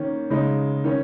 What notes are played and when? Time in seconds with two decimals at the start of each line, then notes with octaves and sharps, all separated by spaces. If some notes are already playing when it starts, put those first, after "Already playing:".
Already playing: D#3 A#3 C#4
0.30 C#3 G#3 D#4
0.84 D#3 C#4